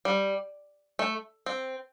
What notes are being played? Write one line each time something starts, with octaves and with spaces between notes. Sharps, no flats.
G3
A3
C4